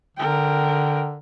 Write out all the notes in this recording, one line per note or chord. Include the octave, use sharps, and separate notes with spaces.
D3 A#4 G5